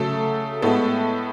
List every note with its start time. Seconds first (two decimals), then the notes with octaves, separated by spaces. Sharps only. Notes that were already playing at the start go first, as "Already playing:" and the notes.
Already playing: C#3 F#3 A3 A4
0.62 A2 G#3 B3 A4